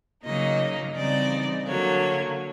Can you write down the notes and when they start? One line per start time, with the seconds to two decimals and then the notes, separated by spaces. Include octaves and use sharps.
0.23 C#3 F#3 A#3 D#4 D#5
0.94 C#3 E3 G3 C4 D#4 D5
1.66 D3 F#3 A#3 C#5